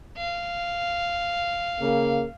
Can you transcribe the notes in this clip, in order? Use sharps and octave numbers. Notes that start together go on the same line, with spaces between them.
F5
C#3 A#3